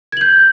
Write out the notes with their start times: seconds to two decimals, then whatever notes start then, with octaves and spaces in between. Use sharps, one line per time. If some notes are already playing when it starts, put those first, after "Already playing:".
0.12 G#6
0.17 F#7
0.21 G6